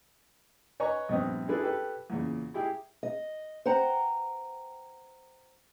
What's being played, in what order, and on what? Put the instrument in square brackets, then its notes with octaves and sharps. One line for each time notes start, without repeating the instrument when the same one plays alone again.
[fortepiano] B4 C#5 D#5 G#5 A#5 C#6
A#1 G2 B3 C4 D#6
D4 E4 F4 G#4 A4 B4
G4 A4 B4
E2 A#2 C#3
E4 G4 G#4 G5
[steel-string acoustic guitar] D#5
C5 F#5 G5 A#5